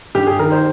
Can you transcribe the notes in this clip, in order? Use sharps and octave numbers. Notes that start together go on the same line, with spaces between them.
G2 G4
G#4
D#3 A#4
C5